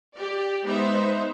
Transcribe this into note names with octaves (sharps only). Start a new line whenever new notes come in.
G4 D5
G#3 B3 D#4 C5 E5